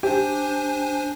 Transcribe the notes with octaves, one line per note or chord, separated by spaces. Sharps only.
D4 G4 C5 G#5